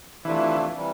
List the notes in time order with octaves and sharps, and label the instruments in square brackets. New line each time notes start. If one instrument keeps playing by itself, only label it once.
[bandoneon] C3 F3 A3 D4 F4 [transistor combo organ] E3
[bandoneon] C3 E3 G3